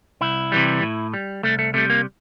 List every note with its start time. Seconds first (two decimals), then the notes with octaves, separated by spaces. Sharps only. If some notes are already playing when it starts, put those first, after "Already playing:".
0.21 C2 E4
0.52 C3 E3 G3
0.83 A2
1.14 G3
1.43 C2 A3
1.59 A3
1.74 C3 G3 A3
1.90 A#3